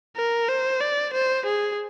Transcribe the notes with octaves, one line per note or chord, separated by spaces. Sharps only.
A#4
C5
D5
C5
G#4